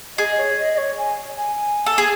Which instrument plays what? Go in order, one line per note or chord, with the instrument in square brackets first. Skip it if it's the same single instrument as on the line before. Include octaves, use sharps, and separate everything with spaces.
[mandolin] G#4 [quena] D#5
[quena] C#5
D#5
D#5
C#5
G#5
G#5
[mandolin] A4
G#4